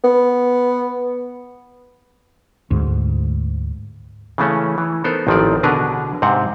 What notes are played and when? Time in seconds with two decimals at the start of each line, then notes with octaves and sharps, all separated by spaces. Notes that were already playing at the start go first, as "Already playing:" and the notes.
0.04 B3
2.71 D2 G#2
4.38 C#3 E3 A3 C#4
4.78 E3
5.04 B3 D#4 A4 A#4 C5
5.27 A1 D#3 F3 C4 D5
5.63 B2 D3 D4 G#4 A#4 B4
6.22 G#2 C3 C4 F#5